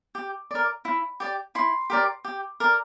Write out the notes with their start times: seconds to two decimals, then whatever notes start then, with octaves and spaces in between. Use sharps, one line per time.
0.15 G4
0.51 A#4 D5
0.85 E4
1.20 G4 D5
1.55 E4 C6
1.90 G4 A#4 D5
2.25 G4
2.60 A#4 D5